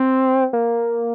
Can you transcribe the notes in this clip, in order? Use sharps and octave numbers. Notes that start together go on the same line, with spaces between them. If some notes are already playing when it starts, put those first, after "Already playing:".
Already playing: C4
A#3